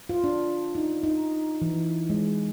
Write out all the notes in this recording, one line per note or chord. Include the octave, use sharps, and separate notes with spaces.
F4
D4
D#4
D#4
E3
G#3